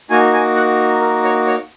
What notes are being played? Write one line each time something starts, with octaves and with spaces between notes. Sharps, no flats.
A#3 D#4 F#4 G#5
G#5
F#5
A#4
C#5
C#5